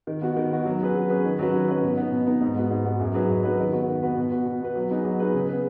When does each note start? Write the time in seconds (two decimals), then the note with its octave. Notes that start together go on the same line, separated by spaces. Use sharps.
0.07 D#3
0.21 B3 F#4
0.36 D#3
0.51 B3 F#4
0.65 F#3
0.80 C#4 G#4 B4
0.95 F#3
1.09 C#4 G#4 B4
1.24 D#3
1.39 F#3 C#4 F#4 B4
1.53 D#3
1.68 F#3 C#4 F#4 B4
1.83 B2
1.97 B3 D#4
2.12 B2
2.26 B3 D#4
2.41 G#2
2.56 G#3 B3 F#4
2.71 G#2
2.85 G#3 B3 F#4
3.00 F#2
3.14 F#3 D#4 G#4 B4
3.29 F#2
3.43 F#3 D#4 G#4 B4
3.58 D#3
3.73 B3 F#4 B4
3.88 D#3
4.02 B3 F#4 B4
4.17 B2
4.31 B3 F#4 B4
4.46 B2
4.61 B3 F#4 B4
4.75 F#3
4.90 B3 D#4 G#4 B4
5.05 F#3
5.19 B3 D#4 G#4 B4
5.34 C#3
5.48 B3 G#4 B4